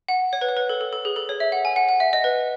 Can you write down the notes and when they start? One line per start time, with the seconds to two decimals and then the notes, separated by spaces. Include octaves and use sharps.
0.09 F#5
0.33 C#5
0.41 B4
0.49 C#5
0.57 B4
0.69 A4
0.81 A4
0.93 A4
1.05 G#4
1.16 A4
1.29 C#5
1.40 E5
1.52 F#5
1.65 G#5
1.76 F#5
1.89 F#5
2.00 E5
2.13 D#5
2.24 B4